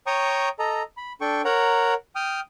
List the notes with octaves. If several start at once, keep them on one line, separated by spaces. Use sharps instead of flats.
C#5 G5 A#5 C#6 D#6
A4 D#5 A#5
B5
D4 A4 G5 C#6
A#4 C#5 F#5 A#5
G5 D#6 F6